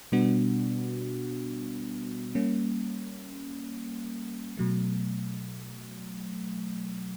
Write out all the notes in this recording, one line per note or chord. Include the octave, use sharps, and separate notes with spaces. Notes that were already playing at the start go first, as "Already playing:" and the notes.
B2 G3 B3 D4 F#4
G3 A#3 C#4
B2 F#3 A3